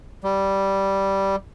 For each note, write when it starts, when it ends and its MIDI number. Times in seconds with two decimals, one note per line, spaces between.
0.24 1.36 55